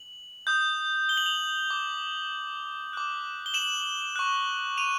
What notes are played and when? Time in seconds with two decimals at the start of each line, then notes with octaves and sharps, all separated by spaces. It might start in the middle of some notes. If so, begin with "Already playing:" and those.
Already playing: F#7
0.47 D#6 G6
1.09 G7
1.17 F#7
1.26 F7 G7
1.70 D6 G6
2.93 D6 F#6
3.46 G7
3.54 E7 F#7
4.16 C#6 F#6
4.77 D#7 F7